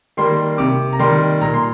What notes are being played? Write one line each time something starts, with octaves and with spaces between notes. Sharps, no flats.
D#3 G3 A#3 C6
C3 D6
A#5
D#3 G3 A#3 C6
A#2 A#5
C6